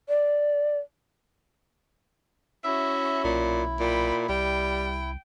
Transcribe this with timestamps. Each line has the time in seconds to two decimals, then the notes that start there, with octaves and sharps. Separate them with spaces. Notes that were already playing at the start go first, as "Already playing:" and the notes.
0.09 D5
2.64 C#4 E4 F#4 E5
3.24 B1 A#2
3.80 A#2 G5 B5
4.29 C2 G3 G5